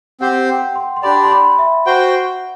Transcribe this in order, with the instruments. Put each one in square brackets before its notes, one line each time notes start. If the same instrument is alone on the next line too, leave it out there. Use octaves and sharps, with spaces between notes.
[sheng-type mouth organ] C4 G4 C5 [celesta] F#5
[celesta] G5
C6
C6
[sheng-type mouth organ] D4 G4 D5 [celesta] B5
[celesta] C6
B5
E5
[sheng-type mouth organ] F#4 C5 G5 [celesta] F#5